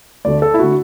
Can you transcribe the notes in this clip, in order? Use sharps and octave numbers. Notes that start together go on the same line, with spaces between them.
D2 D3 A3 D5
A4
E4
D3 A3 F#4